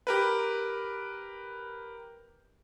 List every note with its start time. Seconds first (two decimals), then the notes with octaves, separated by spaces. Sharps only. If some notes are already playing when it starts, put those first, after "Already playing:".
0.07 G4 A#4 B4